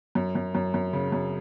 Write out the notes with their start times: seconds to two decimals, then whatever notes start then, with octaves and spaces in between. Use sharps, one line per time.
0.15 F#2
0.35 F#2
0.55 F#2
0.74 F#2
0.93 C#3
1.12 F#2